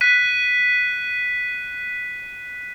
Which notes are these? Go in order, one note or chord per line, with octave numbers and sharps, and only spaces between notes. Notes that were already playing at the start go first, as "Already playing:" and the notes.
F#6 B6 D#7